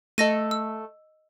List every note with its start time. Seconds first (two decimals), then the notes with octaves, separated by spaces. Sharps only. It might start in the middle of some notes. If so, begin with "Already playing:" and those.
0.18 A3 A4 D#5 A#6 D#7
0.51 E6